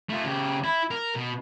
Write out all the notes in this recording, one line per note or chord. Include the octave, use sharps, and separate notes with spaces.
A3 F4
C#3 G4
E4
A#4
B2